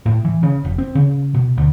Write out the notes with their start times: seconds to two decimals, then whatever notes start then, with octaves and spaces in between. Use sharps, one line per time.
0.06 A2
0.25 E3
0.43 C#3
0.65 F1
0.78 C4
0.95 C#3
1.35 B2
1.58 D2